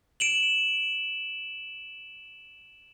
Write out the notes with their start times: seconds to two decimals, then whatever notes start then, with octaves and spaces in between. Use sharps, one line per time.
0.20 D7 E7 F#7